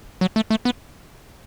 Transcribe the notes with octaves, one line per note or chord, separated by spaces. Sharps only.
F#3
A3
A3
B3